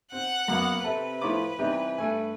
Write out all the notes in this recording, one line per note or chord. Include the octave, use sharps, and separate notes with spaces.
C4 F#5 F#6
F#2 A#3 B3
C3 A4 B4
A2 F3 E4 C#5 D6
C3 E3 G3 D#4 G4
G2 A3 G#5